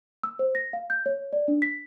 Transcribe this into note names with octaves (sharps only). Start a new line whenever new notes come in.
E6
C5
A#6
F5
G6
C#5
D5
D4
B6